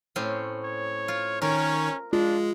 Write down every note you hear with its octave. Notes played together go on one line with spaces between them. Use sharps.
A2 C4 C#4
C#5
F4
D#3 C#4 A#4 C#5
G#3 D4 F4